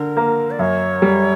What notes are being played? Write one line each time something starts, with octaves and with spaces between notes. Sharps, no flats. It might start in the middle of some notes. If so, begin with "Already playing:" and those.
Already playing: D3 A#4
A#3
D5
F#2 C#5
G3